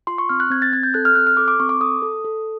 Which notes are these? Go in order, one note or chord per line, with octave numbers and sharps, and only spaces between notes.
F4 C6
C#6
C4 F6
F#6
C4 G#6
A6
C4 G#6
G6
A4 F#6
F6
C4 F#6
F6
A4 D6
D6
C4 C#6
D6
A4 D#6
A4
A4